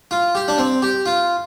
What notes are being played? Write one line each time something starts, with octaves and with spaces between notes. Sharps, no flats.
F4
G4
D4
C4
G4
F4